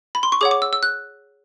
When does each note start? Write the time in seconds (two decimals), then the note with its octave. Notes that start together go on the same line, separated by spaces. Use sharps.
0.15 B5
0.23 C6
0.32 C#6
0.41 G#4 C#5 F#5 D6
0.51 D6
0.62 E6
0.73 E6
0.83 F#6